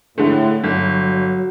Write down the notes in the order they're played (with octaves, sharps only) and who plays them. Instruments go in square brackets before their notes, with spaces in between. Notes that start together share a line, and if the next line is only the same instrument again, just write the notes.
[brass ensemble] A2 [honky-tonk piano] D3 G#3 A3
[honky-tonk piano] G1 [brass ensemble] F#3